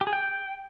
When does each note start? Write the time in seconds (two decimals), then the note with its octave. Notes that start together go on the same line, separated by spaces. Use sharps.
0.01 G4
0.07 G#4
0.13 G5